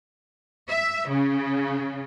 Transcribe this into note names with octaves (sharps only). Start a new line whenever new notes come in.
E5
C#3